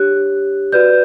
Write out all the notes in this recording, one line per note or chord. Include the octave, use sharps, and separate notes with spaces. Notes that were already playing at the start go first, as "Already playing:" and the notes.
Already playing: D4 G4 C#5 F#6
F#4 B4 D5 G6